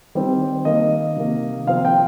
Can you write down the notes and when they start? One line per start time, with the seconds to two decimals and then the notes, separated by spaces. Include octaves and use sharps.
0.15 D#3 G3 C4
0.65 D#3 A#3 D#5
1.16 C3 D#3 A#3
1.67 C3 F3 C4 F5
1.85 G5